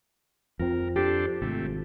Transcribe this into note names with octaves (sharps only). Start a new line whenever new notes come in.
F2 C4 F4 A#4
D4 G4 A4 C5
G#1 C3 A3